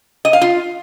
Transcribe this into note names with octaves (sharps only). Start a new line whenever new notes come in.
D#5
F5
F4